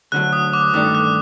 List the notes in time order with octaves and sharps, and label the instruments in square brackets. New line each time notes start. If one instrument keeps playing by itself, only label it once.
[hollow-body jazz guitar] D2 D3 F#3 [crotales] F#6
[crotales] D#6
D6
[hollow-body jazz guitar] G2 D#3 A3 D4 [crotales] D#6
[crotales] F#6